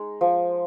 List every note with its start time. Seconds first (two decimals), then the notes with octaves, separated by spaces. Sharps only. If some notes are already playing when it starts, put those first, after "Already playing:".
Already playing: G#3 D#4
0.21 F3